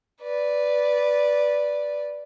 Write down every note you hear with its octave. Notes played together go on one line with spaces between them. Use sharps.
B4 D5